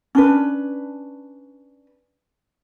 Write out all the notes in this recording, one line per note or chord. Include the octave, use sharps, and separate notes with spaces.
C#4 D4 B4